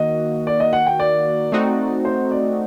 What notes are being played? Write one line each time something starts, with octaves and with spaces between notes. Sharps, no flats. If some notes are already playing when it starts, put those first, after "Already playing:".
Already playing: D#3 A#3 F#4 D#5
D5
D#5
F#5
G5
D5
A3 C4 D#4 F#4
C5
D5